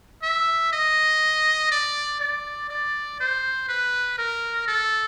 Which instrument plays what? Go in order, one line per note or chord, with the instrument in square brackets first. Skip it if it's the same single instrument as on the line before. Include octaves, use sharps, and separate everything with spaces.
[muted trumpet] E5
D#5
D5
D5
D5
C5
B4
A#4
A4